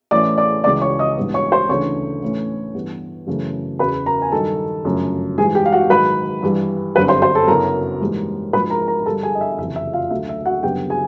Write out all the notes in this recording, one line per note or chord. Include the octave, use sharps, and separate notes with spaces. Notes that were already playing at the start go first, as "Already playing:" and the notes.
A2 E3 A3 C#4 E4 D5 D6
D5 D6
C#2 C#3 E3 D5 D6
C#5 C#6
D#5 D#6
A#1 G#2 E3 G3 B3
C#5 C#6
C5 C6
D2 C#3 E3 A3 D4 C#5 C#6
A2 E3 A3 C#4 E4
G2 E3 G3 B3
F#2 C#3 E3 A3
E2 C#3 F#3 B4 B5
A#4 A#5
G#5
G2 D#3 F#3 A4 A5
G1 F#2 C#3 F3 A3
G#2 E3 G3 G#4 G#5
G4 G5
F5
F#4 F#5
G#2 D#3 F#3 B4 B5
G2 E3 G3
G1 F#2 D3 G3 C4 B4 B5
C5 C6
C5 C6
A4 A5
F#2 C#3 F#3 B3 E4 A#4 A#5
G#2 E3 G3 A#3
A#1 G#2 F3 B4 B5
A#4 A#5
A#4 A#5
G2 D3 G3 A4 A5
G#4 G#5
D#5
E5
F#1 F2 C3 E3 E5
E5
F4 F5
D2 D3 F#3 E5
E5
F#4 F#5
F#1 F#2 D3 G3 B3 G4 G5
G#4 G#5